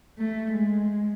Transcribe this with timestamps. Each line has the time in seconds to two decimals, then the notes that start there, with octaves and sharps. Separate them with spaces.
0.19 A3
0.52 G#3